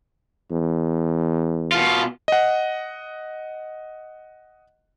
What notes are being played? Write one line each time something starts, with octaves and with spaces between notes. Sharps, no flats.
E2
B2 F4
D#5 F#5